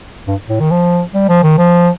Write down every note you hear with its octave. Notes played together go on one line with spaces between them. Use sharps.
G2
A2
D#3
F3
G3
F3
D#3
F3